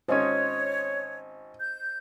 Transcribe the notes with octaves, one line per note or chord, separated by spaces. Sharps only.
G#1 C#4 C5 C#5 D#5
G6